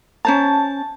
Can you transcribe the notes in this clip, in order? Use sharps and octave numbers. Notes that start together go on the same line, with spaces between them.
C#4 C5 A5 A#5